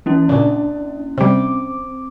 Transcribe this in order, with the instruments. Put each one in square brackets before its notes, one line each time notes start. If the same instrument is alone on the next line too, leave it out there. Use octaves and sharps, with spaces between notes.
[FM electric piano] E3 [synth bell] A#3 C#4 E4
[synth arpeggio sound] A#2 C#3 [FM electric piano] D4
[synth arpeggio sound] C3 G3 [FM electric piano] C4 D6